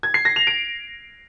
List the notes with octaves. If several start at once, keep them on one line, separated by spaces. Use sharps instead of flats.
G#6
C7
A#6
F7
D7